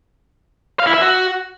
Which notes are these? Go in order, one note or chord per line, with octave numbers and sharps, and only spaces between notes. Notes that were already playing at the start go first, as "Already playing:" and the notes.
F5
E4
E5
F#4